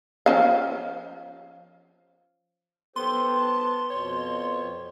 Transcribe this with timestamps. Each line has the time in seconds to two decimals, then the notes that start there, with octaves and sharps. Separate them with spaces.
0.26 F3 C#4 F5
2.96 B3 G4 A4 C5 C6
3.36 A5
3.90 F2 B2 C#5